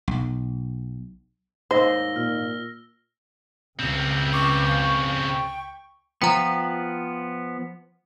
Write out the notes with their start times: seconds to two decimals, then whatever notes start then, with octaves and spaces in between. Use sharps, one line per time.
0.08 B1
1.71 D#2 G#2 D#4 C5 E6 A#6 G7
2.16 A#2 F6
3.79 C#2 C#3 C4
4.33 C#6 D6
4.68 F5
5.29 G5
6.22 F3 B3 G5 A#5